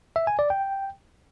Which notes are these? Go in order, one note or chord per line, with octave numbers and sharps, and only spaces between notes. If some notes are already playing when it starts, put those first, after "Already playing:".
E5
G#5
D5
G5